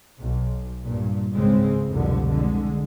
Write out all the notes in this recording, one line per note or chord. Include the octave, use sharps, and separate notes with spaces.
B1
G2 A#2
G#1 C#2 C#3 G#3 C4
F1 C2 B2 D3
D3 G#3